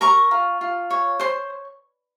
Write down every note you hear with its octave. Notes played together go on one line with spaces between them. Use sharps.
A#4 A#5 C#6
F4
F4
C#5
C5 C6